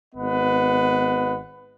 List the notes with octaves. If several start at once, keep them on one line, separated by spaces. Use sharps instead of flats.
G#1 B3 B4 D#5 F#5